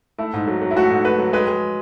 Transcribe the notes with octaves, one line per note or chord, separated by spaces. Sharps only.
A3 E4
G#2
F#3
F#3
E4
A3 F#4
G#2
A3 B4
F#3
G#3 B4
G#3